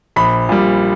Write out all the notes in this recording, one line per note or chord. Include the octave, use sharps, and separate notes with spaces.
A#1 B5
A#2 G3